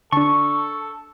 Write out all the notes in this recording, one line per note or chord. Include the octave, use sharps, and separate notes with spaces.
D3 D4 A4 A5 C#6